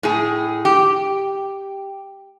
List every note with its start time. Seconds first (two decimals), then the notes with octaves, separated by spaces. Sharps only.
0.03 A2 G#4
0.65 G4